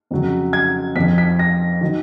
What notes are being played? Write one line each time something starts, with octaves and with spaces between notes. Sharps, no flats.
F2 C#3 F#3
G#6
F2 F3 B6
B6
A#6
D#3 F#3